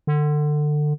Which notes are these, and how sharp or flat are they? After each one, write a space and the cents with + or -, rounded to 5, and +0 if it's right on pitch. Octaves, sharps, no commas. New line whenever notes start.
D3 +25